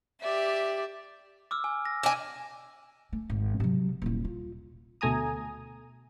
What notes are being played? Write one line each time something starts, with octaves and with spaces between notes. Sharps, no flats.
G4 D5 E5
D6 E6 F6
G#5
A#6
D4 G#5
A3
G#1
C3 F#3
D#1 E4
F4
D2 B2 A3 G#5 A#5 D#6